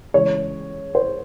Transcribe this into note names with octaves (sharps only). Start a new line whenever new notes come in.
C#3 E3 G#3 C#5
C5